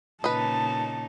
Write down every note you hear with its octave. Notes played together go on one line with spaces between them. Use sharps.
A#2 C#3 D#4 B4 D#5 A5